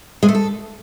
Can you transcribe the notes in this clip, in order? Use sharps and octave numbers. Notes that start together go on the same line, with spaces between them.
G#3
A3
A4